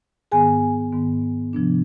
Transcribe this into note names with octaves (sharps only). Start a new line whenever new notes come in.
G#2 D#3 B3 G#4 G#5
G#2 D#3 B3
C3 F3 B3 D4